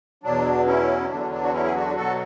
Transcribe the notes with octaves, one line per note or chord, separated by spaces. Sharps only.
E2 B2 F#3 D4
C#4 E4
E2 D3 F#3 D4
D4
F#4
C#4 E4
G#4
D4 F#4
B2 F#3 F#4 A4